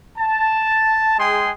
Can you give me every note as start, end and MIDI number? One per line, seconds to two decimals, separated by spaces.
0.17 1.18 81
1.18 1.51 56
1.18 1.51 68
1.18 1.51 79
1.18 1.51 84